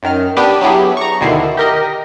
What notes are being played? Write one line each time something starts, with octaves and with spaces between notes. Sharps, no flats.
F#2 D#3 F6
B3 D4 G4 B4
F#3 B3 E4 G4 G#4
A#5 C#6
D2 B2 D3 D#3 E4 C7
G4 A#4 D#5